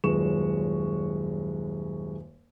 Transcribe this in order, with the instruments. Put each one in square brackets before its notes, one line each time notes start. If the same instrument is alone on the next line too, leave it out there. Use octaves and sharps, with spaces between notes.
[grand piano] D#1 F#2 G#3 B4 C#6 E7